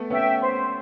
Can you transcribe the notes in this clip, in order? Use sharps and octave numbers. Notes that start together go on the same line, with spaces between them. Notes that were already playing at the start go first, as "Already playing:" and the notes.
Already playing: A3 B3
B3 C#4 E5 G5
C5